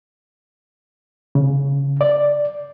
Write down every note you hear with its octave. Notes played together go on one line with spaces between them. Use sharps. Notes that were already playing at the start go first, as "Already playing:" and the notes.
C#3
D5